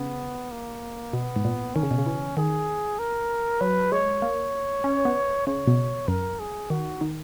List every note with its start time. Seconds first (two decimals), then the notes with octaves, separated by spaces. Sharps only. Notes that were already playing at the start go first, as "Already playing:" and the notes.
Already playing: C#3 B3
0.52 A#3
1.13 B2 B3
1.36 G#2
1.45 A#2
1.75 D#3 C#4
1.83 C#3
1.91 B2
1.98 C#3
2.06 E3
2.37 D#3 G#4
2.99 A#4
3.61 F#3 B4
3.92 G#3 C#5
4.22 A#3
4.84 C#4
5.05 B3
5.47 C#3 C#5
5.67 B2
6.08 F#2 A#4
6.39 G#4
6.70 D#3 F#4
7.01 D#3